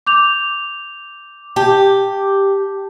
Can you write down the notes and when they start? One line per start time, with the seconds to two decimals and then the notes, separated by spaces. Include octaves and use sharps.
0.06 D6 G6 F7
1.56 G4 A5